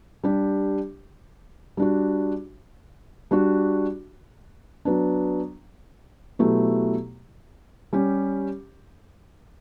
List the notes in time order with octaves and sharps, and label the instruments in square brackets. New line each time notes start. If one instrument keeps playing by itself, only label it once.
[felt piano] G3 D4 G4
G3 D4 F#4
G3 D4 F#4
F#3 B3 D4
B2 F#3 A3 E4 G4
G3 C#4 G4